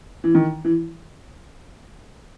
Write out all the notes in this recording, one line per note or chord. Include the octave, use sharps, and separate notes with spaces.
E3
D#3
E3